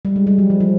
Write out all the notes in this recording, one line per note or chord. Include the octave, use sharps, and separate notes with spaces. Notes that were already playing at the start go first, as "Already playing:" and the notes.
G3
G#3
G3
F#3
F3
F3